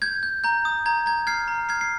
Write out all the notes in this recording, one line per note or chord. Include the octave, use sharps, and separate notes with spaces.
G6 G#6
G6
A#5 G6
D#6
A#5 G#6
A#5 G#6
F6 G#6 C7
A#5
F6 G#6 C7
C7